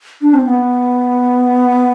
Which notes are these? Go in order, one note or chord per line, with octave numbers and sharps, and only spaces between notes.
D4
C4
B3